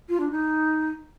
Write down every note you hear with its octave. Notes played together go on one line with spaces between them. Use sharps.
F4
D4
D#4